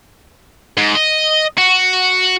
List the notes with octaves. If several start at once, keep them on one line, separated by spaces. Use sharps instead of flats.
G#2
D#5
F#4